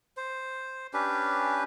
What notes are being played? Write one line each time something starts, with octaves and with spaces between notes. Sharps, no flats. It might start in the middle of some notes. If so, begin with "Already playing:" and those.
C5
C#4 D4 G4 B4